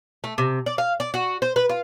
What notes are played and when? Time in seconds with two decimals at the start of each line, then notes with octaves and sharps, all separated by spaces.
0.24 A3
0.38 C3
0.66 D5
0.78 F5
1.00 D5
1.14 F#4
1.42 C5
1.56 B4
1.69 F4